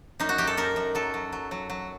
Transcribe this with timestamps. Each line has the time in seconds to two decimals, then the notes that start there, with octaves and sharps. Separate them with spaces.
0.20 F#2 D#4
0.29 F#4
0.38 F#2 G4
0.47 A4
0.57 F#2 A#4
0.76 F#2
0.95 F#3 A4
1.14 F#3
1.33 F#3
1.51 F#3
1.70 F#3